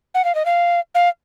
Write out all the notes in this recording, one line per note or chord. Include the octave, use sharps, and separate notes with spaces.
F#5
F5
D#5
F5
F5